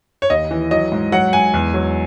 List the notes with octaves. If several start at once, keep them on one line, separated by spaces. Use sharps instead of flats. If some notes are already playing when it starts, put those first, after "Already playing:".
C#5
D#2 D#5
E3
F#3 D#5
G#2
F#3 F#5
G#2 G#5
E2
F#3